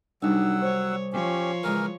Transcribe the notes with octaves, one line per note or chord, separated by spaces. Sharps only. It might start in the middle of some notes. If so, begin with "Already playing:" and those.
C2 F#3 D4 D#4 F#5 E6
C5 C#5
F3 C#4 G4 C#5
C#2 E3 A#4